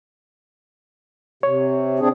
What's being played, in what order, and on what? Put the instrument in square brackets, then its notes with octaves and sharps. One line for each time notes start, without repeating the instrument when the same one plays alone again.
[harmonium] C3 [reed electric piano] C#5
[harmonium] C4 D4 G#4